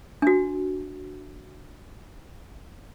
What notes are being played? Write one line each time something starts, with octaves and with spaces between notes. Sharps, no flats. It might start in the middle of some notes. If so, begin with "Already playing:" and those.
D4 F#4